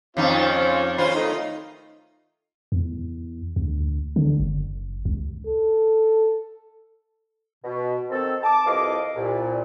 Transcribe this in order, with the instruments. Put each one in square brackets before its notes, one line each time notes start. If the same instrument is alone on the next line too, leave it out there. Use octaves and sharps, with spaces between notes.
[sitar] F2 D#4 [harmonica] C4 C#4 F4
[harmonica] C#4 C5 B5 [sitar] F4
[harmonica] D#3 A3 D#4
[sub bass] E2
D2
D3
F#1
C#2
[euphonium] A4
[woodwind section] B2
D#3 C4 A4
A5 D6
C2 F2 E3 D#5 F5 D6
C2 A#2